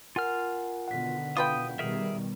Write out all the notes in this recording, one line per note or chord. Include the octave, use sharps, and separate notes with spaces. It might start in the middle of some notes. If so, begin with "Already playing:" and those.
F4 A#4 F#5 G#5 F6
B2 D3 D#3 F#5 B6
F4 B4 G5 D#6
B2 D#3 G3 G#4 A#4 E5